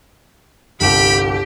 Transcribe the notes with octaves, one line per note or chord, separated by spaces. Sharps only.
G1 C2 G4 B5